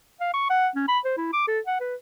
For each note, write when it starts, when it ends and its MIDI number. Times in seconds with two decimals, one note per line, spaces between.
0.20 0.33 77
0.34 0.46 85
0.50 0.68 78
0.76 0.86 61
0.88 0.99 83
1.05 1.17 72
1.17 1.31 64
1.33 1.44 86
1.47 1.60 69
1.67 1.78 78
1.80 1.95 71